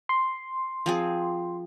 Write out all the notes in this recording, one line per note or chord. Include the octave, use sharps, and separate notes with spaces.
C6
F3 C4 G#4